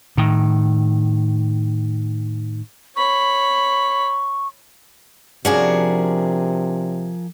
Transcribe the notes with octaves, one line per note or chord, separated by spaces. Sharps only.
A2 D#3
C#5 B5 C#6
C3 F3 C#4 D4 F#4 G#4 A#4